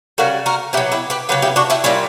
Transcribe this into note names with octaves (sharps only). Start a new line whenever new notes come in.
C#3 G3 F#4 A#4
F#4 A#4
B2 F#3 E4 G4
E4 G4
G4 B4
C#3 F#3 G4 B4
E4 G4
D4 F#4
E4 G4
A#2 G3 C#4 E4